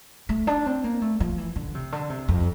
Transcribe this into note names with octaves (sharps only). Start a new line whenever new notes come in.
A3
D4
C4
A#3
A3
F3
E3
D3
C3
D3
C3
F2